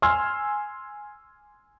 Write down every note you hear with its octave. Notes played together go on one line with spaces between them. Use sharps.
G#5 C6 E6 F6